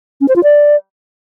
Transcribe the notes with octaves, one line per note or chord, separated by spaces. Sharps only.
C#4
C5
F4
D5